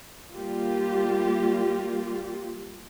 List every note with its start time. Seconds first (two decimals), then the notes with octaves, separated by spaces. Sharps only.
0.32 G3 A#3 F4 G4